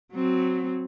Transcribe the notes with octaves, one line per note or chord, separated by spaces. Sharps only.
F#3 C4